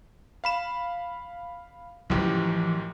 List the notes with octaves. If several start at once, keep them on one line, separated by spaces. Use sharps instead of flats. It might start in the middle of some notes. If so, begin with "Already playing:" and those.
F5 B5 E7
A1 F#2 E3 F3 G4